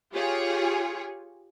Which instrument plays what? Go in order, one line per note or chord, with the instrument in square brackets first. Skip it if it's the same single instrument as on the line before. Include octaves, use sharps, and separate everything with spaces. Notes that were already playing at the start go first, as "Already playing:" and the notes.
[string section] F4 G4 G#4 C#5